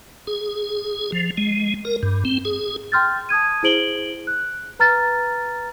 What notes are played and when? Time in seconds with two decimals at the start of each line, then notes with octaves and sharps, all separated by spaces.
0.27 G#4
1.12 F3
1.37 G#3
1.85 A#4
2.03 G2
2.25 C4
2.45 G#4
2.92 G5 C6 F6 G6 A6
3.29 A5 D#6 G#6 D#7
3.63 E4 G#4 C5 D7 F#7 G7
4.27 F#6
4.79 B4 A#5 F6 A6